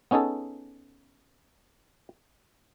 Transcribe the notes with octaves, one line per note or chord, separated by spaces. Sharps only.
B3 C#4 D#4 G#4 A4